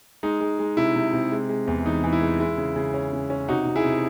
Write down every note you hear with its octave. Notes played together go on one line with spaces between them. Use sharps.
G#3 D#4
G#3
G#3
C3 E4
C3
C3
G#3
G#3
E2
E3 D#4
E3
E4
G#3
G#3 E4
C#3
C#3
C#4
C#3
C#4
C3 D#4 F#4
C3
E4 G#4
C3